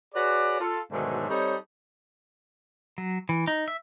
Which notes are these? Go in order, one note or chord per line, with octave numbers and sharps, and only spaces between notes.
F#4 G#4 B4 C#5 D5
F4 A4
G#2 B2 D3 D#3 F#3 A3
G3 C4 D#4 A4 C#5
F#3
E3
D#4
E5